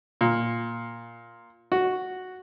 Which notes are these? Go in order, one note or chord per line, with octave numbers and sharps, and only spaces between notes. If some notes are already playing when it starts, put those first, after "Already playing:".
A#2
F#4